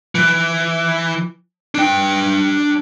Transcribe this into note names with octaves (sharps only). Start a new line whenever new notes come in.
E3
D4 G5